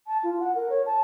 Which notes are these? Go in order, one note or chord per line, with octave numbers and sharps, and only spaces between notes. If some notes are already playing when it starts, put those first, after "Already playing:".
A5
F4
F#5
A#4
C#5
A5